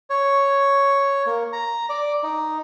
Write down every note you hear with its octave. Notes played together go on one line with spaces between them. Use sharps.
C#5
A#3
A#5
D5
D#4